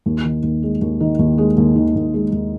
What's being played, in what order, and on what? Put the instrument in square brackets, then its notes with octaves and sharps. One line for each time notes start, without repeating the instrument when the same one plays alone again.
[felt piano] D#2
D#3
D#2
G#3
D#2
D#3
D#2
G#3
D#2
D#3
D#2
G#3
D#2